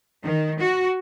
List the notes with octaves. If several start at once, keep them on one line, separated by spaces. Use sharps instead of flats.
D#3
F#4